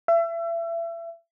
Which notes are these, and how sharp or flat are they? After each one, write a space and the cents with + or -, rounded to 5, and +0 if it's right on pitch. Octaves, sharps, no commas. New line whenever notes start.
E5 +30